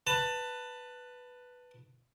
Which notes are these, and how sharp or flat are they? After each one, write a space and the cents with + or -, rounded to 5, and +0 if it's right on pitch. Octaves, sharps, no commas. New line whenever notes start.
B4 +0 A5 +20